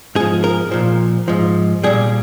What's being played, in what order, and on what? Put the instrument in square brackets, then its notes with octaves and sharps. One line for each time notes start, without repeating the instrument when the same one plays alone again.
[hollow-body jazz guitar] G#2 F3 G#4
A#4
A#2 F3
G#2 F3
A#2 G3 G#4